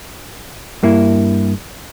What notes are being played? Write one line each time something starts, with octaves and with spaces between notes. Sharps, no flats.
G2 A#3 E4